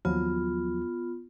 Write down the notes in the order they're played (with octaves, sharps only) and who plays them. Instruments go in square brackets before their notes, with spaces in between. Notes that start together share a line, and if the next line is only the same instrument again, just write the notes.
[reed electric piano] D#2 F3 F#3 [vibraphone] B3 F4